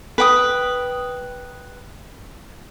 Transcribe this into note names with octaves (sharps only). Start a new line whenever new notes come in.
B4 G5 D#6